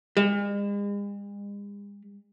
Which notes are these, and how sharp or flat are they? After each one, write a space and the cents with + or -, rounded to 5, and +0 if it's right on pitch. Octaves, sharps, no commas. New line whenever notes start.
G#3 -45